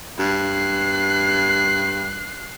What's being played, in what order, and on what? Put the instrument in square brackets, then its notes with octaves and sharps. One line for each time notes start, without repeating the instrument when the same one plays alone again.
[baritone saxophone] G2 [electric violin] F#6 C7